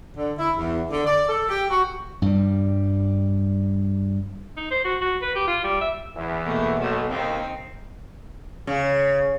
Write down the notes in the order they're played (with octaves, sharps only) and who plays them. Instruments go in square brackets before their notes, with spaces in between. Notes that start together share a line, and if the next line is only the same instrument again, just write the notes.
[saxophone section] D3
E4
E2
D3
D5
A4
G4
F#4
[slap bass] G2 G3
[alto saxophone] D#4
C5
F#4
F#4
B4
G4
F4
G3
E5
[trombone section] E2 E3
[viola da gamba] B2 A3 A#3
[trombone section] B1 [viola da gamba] A3
[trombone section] D#2 [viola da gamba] C4 D#4
[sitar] C#3